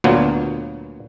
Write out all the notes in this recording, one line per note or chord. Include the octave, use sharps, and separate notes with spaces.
D2 A#2 F#3 A#3 B3